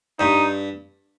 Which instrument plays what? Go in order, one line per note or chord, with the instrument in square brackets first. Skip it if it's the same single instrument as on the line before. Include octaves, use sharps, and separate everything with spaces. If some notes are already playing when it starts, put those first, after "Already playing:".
[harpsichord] G2 [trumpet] D#4